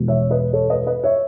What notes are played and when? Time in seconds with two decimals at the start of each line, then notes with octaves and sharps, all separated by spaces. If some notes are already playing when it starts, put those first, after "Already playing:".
Already playing: E2 B2 G#3
0.08 C#5 E5
0.31 B4 D#5
0.53 A4 C#5
0.70 B4 D#5
0.87 B4 D#5
1.03 C#5 E5